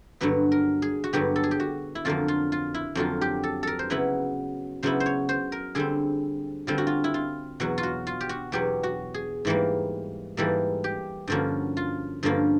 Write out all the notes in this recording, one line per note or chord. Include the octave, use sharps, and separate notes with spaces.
G2 D3 F#3 B3 B4
A#4
G#4
F#4
G2 D3 F#3 B3 G4
A4
G#4
G4
F#4
E4
F2 D3 F#3 A#3 F4
F4
F4
E4
F2 D3 F#3 A#3 F4
G4
A4
A4 A#4
C5
C#3 F#3 B3 E4 B4
C#3 F#3 B3 E4 C5
C5
C#5
C5
A#4
D3 G3 C4 G#4
D3 G3 C4 F4
F#4
F4
E4
F4
E2 B2 F#3 F#4
F4
F#4
F4
G4
F#4
E2 B2 F#3 G4
F#4
G#4
G#2 E3 G3 A#3
G#2 E3 G3 A#3 A4
G4
G2 D3 F3 A#3 C#4 F#4
F4
G2 D3 F3 A#3 C#4